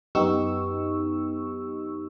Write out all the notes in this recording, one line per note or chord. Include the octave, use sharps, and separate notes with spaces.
F#2 B3 D#4 G4 C#6 E6